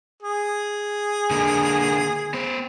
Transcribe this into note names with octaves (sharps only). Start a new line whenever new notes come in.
G#4
D3 A#3
B3 C5